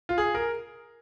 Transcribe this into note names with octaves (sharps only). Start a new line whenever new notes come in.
F4
G#4
A#4